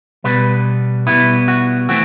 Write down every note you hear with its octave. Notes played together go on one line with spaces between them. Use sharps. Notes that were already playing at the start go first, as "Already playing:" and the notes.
B2 G3 B3 B4
B2 G3 B3 E4
F#4
E3 A3 C4 F#4